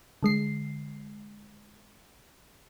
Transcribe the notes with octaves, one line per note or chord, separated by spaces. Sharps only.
D3 G#3 C7